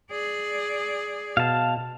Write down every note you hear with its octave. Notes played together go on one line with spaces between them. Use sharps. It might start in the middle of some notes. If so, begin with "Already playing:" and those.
G#4 D5
B2 F5 A5